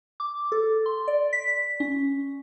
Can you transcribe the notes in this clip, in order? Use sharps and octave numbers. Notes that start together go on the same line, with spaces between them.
D6
A4
C6
D5
B6
C#4